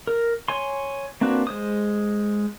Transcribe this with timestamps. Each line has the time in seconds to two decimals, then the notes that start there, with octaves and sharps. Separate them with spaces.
0.07 A#4
0.48 C#5 G#5 C6
1.21 A#3 C4 D4 F#4 B4
1.47 G#3 C5 D#6